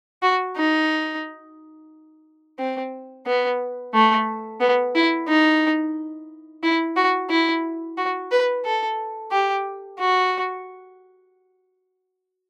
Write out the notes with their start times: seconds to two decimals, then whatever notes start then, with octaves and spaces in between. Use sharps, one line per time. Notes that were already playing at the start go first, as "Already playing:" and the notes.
0.23 F#4
0.57 D#4
2.59 C4
3.26 B3
3.94 A3
4.60 B3
4.95 E4
5.28 D#4
6.63 E4
6.96 F#4
7.30 E4
7.97 F#4
8.31 B4
8.65 A4
9.32 G4
9.99 F#4